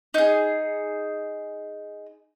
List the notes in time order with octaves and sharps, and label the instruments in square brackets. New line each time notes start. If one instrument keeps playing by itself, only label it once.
[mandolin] D#4 G#4